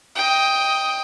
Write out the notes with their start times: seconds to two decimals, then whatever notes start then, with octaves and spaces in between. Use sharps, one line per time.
0.15 D#5 G5